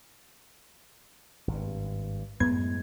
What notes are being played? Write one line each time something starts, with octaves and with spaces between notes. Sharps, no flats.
G#1 G2
F#2 A2 G#3 B3 G#6